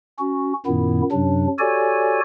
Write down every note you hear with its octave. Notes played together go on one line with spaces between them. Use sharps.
C#4 F#4
F#2 A#2 D#3 B3 E4
F#2 C3 F#3 D4
F#4 G4 A4 C#5 D5 G#5